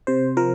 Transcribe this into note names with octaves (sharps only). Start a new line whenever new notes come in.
C3 C5
F3 A#4